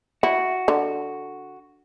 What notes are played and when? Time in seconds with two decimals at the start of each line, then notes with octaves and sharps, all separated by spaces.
0.23 E4 F#4
0.68 D3